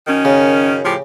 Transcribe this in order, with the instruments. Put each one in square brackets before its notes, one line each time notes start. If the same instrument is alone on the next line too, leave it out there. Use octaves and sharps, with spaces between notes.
[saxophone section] F#2 D#3 C#4
[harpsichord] C#3
[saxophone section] A2 F3 G4